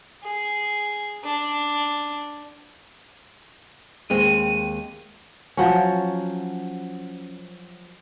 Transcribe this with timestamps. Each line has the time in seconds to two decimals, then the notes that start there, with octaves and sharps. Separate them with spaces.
0.23 G#4
1.24 D4
4.10 D#2 G#3 C4 D#7
5.57 F3 F#3 C#4